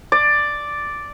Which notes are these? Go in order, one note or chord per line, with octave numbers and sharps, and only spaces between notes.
D5